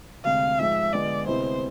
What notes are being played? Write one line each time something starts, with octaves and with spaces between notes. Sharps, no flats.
D2 C3 G#3 F5
G#2 F3 G#3 E5
D3 G#3 B3 F4 D5
D2 C3 G#3 B3 E4 C5